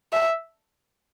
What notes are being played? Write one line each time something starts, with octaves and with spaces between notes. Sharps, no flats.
E5